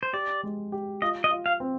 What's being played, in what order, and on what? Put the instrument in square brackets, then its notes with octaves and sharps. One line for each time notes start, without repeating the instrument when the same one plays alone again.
[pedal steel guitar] C5
[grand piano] G4 [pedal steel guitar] D5
[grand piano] G#3
G4
[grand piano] F4 [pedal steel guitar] D#5
[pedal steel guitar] D#5
[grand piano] F4
[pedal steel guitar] F5
[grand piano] C4